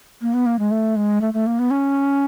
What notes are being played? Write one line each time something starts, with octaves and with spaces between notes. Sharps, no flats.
A#3
B3
A#3
G#3
A3
G#3
A3
A3
A#3
B3
C#4